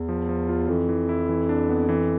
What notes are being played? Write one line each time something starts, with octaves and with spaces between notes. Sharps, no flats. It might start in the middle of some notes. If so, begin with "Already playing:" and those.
Already playing: E2
F3
F3
F4
F2 E3
E3
E4
E3
D4
B3
E3